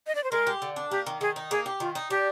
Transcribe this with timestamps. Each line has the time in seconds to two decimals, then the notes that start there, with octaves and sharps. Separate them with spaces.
0.07 D#5
0.15 D5
0.24 C5
0.32 G#3 A#4
0.47 G4
0.62 D3
0.76 D4
0.91 A#3 G4
1.06 D#3
1.21 D#3 G#4
1.36 D#4
1.51 A#3 G#4
1.66 G4
1.80 D#3 F4
1.95 D#4
2.10 D4 G4